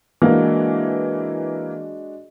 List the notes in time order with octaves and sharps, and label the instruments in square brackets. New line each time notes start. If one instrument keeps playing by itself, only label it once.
[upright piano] E3 A#3 [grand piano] G#3 D4 F#4